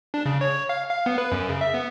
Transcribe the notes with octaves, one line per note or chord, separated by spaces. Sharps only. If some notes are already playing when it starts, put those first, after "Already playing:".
D4
C#3
C#5
F5
F5
B3
B4
F#2
C#3
E5
B3